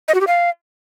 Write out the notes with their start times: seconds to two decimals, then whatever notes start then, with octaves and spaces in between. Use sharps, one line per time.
0.08 D#5
0.15 F#4
0.21 G4
0.27 F5